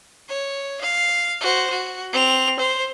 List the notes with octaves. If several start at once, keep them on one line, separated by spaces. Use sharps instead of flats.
C#5
F5
F#4 C5
F#4
C4 F7
C5